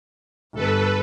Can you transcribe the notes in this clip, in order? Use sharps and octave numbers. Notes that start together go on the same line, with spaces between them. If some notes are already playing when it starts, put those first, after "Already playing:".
G1 A4 B4